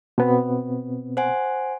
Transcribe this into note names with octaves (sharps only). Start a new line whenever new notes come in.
B2 B3 C4
C5 F#5 G#5